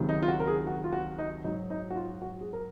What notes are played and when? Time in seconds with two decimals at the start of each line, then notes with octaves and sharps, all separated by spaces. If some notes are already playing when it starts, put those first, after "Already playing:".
Already playing: C#2 C3 D#3 F#3
0.09 D#4
0.22 F4
0.28 F#4
0.40 A#4
0.47 G#4
0.67 F#4
0.84 F4
0.93 F#4
1.18 D#4
1.44 G#2 F#3 D#4
1.70 D#4
1.90 F#4
1.96 F4
2.22 F#4
2.41 G#4
2.53 A#4